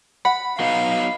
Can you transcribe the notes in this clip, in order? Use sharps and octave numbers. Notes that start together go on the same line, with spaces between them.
F#5 B5
F#3 B3 D#4 F5